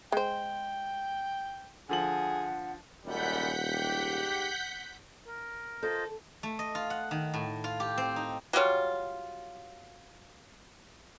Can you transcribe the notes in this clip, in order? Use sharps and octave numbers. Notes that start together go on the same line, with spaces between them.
G#3 C5 G5
D3 F3 G#4 F#5 F#7
D#1 F#2 G3 G#3 F#5 G6 B6
G#2 G4
A#4
F4 A4 C5 D#5
A3
D#5
F4
F#5
D#3
A2
F4
G4
C4
D#4
F#3 G3 F4 C#5